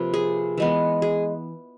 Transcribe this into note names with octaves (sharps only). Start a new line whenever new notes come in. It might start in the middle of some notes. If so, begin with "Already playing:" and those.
Already playing: C3 F3 A#3 B4
G#4
E3 G#3 B3
G#4